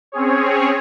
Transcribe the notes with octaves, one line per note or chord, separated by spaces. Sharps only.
C4 C#4 G#4 C#5